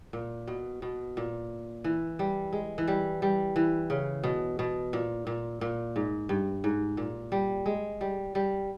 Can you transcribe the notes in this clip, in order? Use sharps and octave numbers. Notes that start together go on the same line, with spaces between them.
A#2
B2
B2
A#2
E3
G3
G#3
E3
G3
G3
E3
C#3
B2
B2
A#2
A#2
A#2
G#2
G2
G#2
A#2
G3
G#3
G3
G3